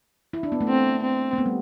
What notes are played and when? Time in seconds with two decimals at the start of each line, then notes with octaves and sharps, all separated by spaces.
0.33 E4
0.43 D4
0.52 B3
0.61 A3
0.68 C4
1.03 C4
1.33 A3
1.38 B3
1.46 G3